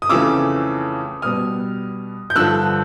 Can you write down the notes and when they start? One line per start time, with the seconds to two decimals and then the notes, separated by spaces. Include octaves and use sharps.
0.02 D#6
0.09 F2 C#3 E3 A3 C#4 D6 E6
1.22 B2 G3 B3 D#6 F6
2.30 G6
2.36 G2 D3 F3 E6 F#6